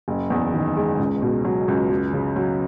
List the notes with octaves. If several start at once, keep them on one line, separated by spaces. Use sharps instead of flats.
F#1
E2
D#3
G#3
C#2
B2
F#3
C#2
F#2
C#3
F#3